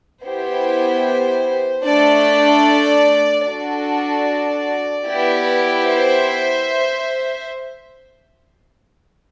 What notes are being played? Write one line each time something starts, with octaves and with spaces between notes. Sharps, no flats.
B3 E4 G4 C5
A3 D4 A4 D5
D4 F#4 A4 D5
B3 E4 G4
C5 E5